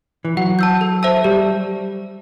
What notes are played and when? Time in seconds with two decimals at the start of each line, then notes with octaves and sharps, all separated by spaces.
0.25 E3
0.37 F#3 F#5
0.59 A5 E6 G6
0.81 A4
1.03 C5 E5 A5 E6
1.24 G3 G4